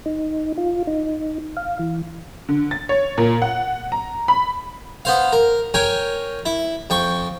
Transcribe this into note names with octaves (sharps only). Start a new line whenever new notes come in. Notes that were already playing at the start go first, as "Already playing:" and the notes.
D#4
F4
D#4
F5
E3
D3
A6
C#5
A#2
F#5
A#5
B5
B3 C5 F5
A#4
A#4 C#5 G5 G#5
E4
F2 G5 C#6